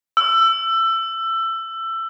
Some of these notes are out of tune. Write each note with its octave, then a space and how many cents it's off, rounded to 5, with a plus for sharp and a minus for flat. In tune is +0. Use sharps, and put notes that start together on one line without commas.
E6 +20